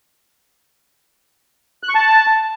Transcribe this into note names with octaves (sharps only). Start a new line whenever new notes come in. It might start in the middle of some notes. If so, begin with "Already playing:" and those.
F#6
C#6
A5